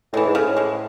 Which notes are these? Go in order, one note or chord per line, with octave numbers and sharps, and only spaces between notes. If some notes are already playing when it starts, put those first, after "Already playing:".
A2 E3 G#3
G#2
A2 C#3
E3 G#3